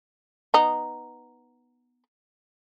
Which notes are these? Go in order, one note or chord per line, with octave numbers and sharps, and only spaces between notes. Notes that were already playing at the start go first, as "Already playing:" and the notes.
B3 D#4